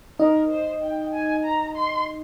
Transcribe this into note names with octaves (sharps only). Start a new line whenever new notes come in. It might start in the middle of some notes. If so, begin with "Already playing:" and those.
D#4 A#4 D#5
C5
G5
G#5
A#5
C6